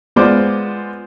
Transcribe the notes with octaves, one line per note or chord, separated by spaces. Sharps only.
G#3 B3 F4 C5 D5 D6